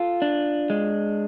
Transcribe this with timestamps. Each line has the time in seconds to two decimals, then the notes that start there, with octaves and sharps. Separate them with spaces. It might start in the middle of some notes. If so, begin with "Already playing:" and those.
Already playing: F4 A4
0.22 D4
0.70 G#3